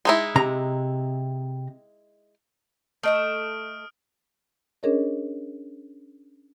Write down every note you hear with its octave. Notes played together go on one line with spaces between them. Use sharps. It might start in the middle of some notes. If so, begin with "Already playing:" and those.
G#3 D#4 E4
C3 A#5
A3 D#5 E5 D#6 F6 D7
C#4 D4 G#4 A#4 C#5 D#5